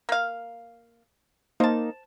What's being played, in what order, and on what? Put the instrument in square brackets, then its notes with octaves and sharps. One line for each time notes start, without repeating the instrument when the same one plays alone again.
[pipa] A#3 F5
[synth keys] A#3 D#4 [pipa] C5 A5